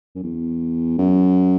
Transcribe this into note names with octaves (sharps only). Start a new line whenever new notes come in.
F#2
E2
F#2